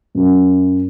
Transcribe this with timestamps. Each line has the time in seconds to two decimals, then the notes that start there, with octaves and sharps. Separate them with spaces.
0.15 F#2